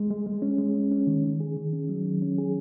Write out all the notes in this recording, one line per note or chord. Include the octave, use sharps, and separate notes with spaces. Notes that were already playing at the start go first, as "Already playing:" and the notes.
Already playing: G#3
G#3
G#3
C#4
G#3
C#4
C#4
D#3
D#3
G#4
D#3
C#4
F#3
D#3
C#4
G#4